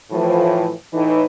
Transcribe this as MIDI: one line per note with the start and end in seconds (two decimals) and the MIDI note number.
0.11 0.71 45
0.11 0.71 52
0.11 0.71 53
0.93 1.23 45
0.93 1.23 52
0.93 1.23 63